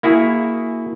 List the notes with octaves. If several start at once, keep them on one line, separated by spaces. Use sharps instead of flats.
A#3 E4 F#4 G#4